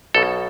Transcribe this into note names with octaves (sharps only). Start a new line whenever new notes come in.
B1 B2 A4